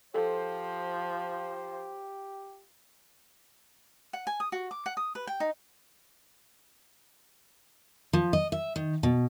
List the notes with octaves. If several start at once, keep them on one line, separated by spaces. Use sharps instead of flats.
F3 G4 A4 C5
F#5
G#5
D#6
F#4
D6
F#5
D#6
B4
G5
D#4
F3
D#5
E5
D#3
B2